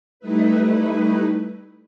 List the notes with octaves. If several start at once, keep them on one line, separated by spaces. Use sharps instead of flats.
G3 A3 D#4 E4 B4